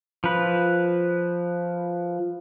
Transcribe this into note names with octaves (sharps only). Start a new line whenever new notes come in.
F3 B4